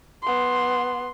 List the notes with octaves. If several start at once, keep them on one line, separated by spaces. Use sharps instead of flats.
B3 C6